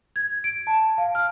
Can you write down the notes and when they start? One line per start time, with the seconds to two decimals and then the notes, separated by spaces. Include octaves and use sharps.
0.16 G#6
0.44 D7
0.67 A5
0.98 F5
1.15 F6